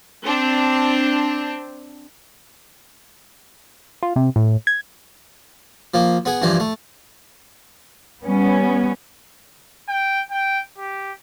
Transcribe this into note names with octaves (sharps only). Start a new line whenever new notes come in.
C4 D4
F4
C3
A2
G#6
F3 A#3
B3 G#4
G2 E3 F3
A3
G3 B3 C#4
G5
G5
G4